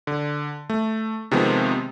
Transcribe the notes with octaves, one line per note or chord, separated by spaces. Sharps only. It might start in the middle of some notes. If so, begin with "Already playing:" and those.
D3
A3
C3 D#3 F3 G#3 B3 C4